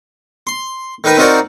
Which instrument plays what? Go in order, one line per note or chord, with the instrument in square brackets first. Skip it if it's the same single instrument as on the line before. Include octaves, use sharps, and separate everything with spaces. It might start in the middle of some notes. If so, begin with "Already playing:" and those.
[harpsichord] C6
D#3 D#4 A#4 B4
C4 D#4 F4 F#4 A#4 D5